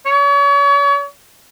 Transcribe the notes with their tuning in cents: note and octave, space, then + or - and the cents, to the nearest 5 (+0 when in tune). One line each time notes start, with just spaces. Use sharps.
C#5 +40